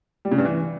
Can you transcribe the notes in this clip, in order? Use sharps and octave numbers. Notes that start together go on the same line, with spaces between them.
G3
C#3
G2
E3